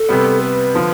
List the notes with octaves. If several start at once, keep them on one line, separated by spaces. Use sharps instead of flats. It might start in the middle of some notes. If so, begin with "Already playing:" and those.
Already playing: A4
C3 G3 B3
B4
D3 F3